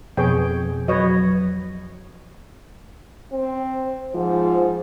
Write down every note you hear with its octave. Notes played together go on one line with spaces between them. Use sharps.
F2 B2 G#4 C#5 G5
F#3 B4 C#5 D#5
C4
G#2 F3